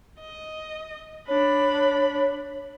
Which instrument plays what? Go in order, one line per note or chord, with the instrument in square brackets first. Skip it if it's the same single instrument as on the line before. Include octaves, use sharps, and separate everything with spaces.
[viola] D#5
[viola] D4 B5 [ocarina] C#5